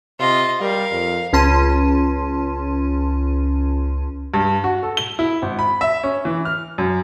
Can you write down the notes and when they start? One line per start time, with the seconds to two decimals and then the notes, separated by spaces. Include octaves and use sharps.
0.19 C3 F4 D#5
0.61 G3 A#4 F5
0.92 F2
1.33 C#2 C#4 A5 C6 D#7
4.34 G2
4.64 F#4
4.83 A4
4.97 G7
5.19 E4
5.42 G#1
5.59 B5
5.81 E5
6.03 C#4
6.25 E3
6.45 F6
6.78 F#2